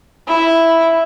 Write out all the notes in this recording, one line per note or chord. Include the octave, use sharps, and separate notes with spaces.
E4